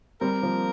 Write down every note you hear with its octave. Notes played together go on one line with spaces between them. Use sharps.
G3 C4 A#4
F3 A#3